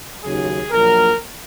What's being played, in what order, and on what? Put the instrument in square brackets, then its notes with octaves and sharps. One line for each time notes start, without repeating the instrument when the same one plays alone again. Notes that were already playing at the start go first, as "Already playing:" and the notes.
[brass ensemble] D#2 C#3 F#3 G#4
A#1 A#2 F#3 A#4